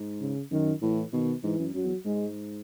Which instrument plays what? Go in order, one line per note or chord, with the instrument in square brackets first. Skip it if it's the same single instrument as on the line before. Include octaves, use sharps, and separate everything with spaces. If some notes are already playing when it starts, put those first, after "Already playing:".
Already playing: [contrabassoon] G#2
[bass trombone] C#3
[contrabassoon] F#2 [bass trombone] D#3
[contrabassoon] A2 [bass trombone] E3
[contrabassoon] B2 [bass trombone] D#3
[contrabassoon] G#2 [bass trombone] E3
[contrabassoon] F#2
[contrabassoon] F#2 [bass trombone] F#3
[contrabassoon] E2
[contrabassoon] G#2 [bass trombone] G#3